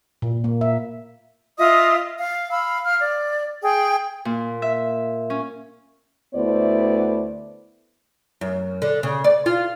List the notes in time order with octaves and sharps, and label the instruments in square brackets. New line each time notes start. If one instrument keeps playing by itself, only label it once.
[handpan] A#2
A#3
E5
[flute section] F4 D#5 E5 D#6
F5
F5 B5 E6
F5 F6
D5
G#4 G5
[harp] A#2
E5
C#4
[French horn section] D2 A3 B3 E4 C5 D5
[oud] F#2
D3
C#3
D5
F4